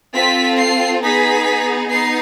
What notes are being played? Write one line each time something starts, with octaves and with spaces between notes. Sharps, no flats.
C4 F4 A4 B6
C7
B3 D#4 G#4 B6
B3 D#4 C7